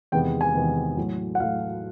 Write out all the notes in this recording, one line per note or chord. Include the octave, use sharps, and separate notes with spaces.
E2 C3 D#3 G#3 B3 G5
G#5
E2 C3 D#3 G#3 B3
A2 F#3 A3
F#5
A2 F#3 A3 F5